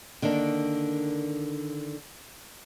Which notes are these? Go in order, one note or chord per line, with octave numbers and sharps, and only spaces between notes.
D3 D#3 A#3 D4